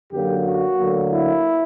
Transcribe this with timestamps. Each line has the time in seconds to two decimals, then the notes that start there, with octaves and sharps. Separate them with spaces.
0.12 F#2 D3 F#3 A#3 G4
0.46 F#4
0.79 D2 D3 F#3 A#3
1.12 E4